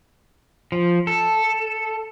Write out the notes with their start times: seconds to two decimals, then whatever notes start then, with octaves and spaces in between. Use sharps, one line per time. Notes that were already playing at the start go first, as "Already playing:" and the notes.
0.72 F3
1.07 A4